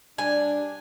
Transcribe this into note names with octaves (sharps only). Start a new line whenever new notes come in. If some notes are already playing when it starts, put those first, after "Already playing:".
G3 D4 G#5